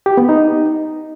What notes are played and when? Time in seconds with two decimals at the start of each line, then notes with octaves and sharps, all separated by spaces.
0.06 G4
0.17 B3
0.29 D#4